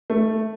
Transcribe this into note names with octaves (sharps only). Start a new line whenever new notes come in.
A3